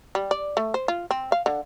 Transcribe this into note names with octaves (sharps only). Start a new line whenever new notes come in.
G3
D5
A3
C5
F4
C4
F5
D3